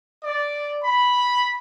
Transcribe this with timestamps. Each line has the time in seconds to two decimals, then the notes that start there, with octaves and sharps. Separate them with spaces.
0.23 D5
0.83 B5